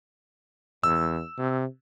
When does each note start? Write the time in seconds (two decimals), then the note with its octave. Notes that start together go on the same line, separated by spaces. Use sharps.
0.84 E2 E6
1.38 C3